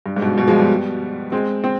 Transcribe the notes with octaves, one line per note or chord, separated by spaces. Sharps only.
G2
G#2
G2 B2
G2 B2
F3 G#3
G3 B3
G#3 C4
C4